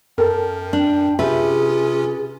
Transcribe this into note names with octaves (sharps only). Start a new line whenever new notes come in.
F#2 A4 A#4 G5
D4
C3 C#4 F4 G4 G#4 B4 E5